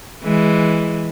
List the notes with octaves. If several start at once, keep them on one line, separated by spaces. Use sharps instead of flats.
E3 G#3